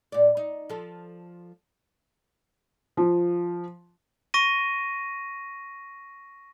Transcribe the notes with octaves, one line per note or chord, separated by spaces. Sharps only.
A#2 D5
D#4
F3 A4
F3
C#6 A#6 D#7